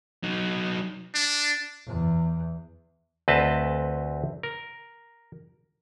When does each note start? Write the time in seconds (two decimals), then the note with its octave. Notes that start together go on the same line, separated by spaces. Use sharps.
0.23 F#3 D#4
1.15 D4
1.87 E2
3.28 D2 C4 B4 D#5 A5
4.43 A#4